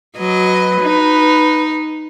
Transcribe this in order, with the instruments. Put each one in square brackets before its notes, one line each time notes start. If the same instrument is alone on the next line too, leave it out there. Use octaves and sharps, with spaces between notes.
[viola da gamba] F#3 D#5 [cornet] B4
[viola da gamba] D#4